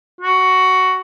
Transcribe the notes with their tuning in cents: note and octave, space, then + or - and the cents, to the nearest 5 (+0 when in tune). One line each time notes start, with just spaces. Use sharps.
F#4 +10